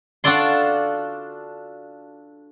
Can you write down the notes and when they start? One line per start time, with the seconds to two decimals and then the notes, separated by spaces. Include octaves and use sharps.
0.24 D4 F4 F#4 A4 D5 C6